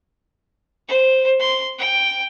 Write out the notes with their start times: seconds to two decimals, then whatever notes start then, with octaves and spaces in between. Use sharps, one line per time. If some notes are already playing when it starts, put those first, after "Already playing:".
0.88 C5
1.40 C6
1.78 G5